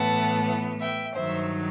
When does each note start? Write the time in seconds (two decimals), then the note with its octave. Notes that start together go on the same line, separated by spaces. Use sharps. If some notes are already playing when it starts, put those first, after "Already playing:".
Already playing: A2 E3 B3 F#5 A5
0.81 E5 G5
1.14 G2 D#3 F#3 C5 E5